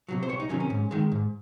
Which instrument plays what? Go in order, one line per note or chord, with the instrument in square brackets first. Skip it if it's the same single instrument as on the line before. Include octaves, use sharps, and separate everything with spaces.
[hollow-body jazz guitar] C3 D#3 F#3
C5
C2 C#5
D#4
C3 D#3 F#3 C#4
C#4
G#2
D#3 G#3
G#2